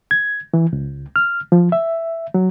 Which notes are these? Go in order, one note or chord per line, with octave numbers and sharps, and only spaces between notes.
G#6
E3
C#2
F6
F3
E5
F#3